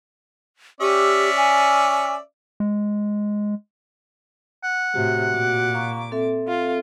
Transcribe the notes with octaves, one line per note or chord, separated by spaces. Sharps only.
C#4 G4 D5 E5
G#5
G#3
F#5
A2 C3 F#4
A#2 F#4 D6
F5 A#5 C#6
C4 A4 E5
F4